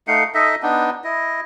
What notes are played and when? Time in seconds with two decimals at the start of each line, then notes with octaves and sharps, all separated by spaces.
0.08 A3 D#4 F5 F#5
0.34 D#4 A4 D#5 E5
0.63 B3 D4 D#4
1.04 E4 D#5